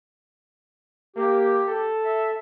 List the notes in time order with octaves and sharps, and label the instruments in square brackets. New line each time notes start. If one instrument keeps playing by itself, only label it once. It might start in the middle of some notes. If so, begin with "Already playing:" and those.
[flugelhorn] A#3 [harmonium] G4
[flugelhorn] A4
[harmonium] E5